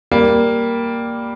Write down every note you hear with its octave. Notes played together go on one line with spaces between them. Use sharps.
G3 A#3